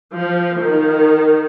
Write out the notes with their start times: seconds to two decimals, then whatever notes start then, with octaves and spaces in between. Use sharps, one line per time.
0.15 F3
0.63 D#3